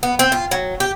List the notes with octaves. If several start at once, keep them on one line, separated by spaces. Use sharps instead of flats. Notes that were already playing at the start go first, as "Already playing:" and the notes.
B3
C4
F4
F#3
G4